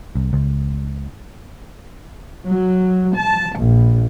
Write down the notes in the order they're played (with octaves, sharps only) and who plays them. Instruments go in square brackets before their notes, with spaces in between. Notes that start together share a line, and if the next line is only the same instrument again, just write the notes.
[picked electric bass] C2
C#2
[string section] F#3
A5
A#1